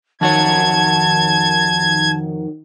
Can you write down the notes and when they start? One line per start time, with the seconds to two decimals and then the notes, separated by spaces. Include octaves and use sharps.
0.21 F2 D#3 F#4 C#5 A5 G#6